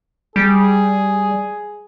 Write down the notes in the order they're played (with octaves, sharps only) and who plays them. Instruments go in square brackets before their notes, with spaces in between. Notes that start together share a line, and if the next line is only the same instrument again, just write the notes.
[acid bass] G3 [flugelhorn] G#4